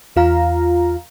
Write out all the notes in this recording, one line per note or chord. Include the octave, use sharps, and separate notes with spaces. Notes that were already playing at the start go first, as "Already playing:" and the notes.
E2 F4 F5 A#5